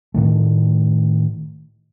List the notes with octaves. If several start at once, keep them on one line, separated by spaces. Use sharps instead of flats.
A2 D#3 A3